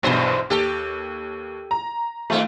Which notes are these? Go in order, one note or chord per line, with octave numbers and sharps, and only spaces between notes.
B1 E2 G2 B2 C5
D#2 G4 A4
A#5
G2 D#3 A3 C4 F4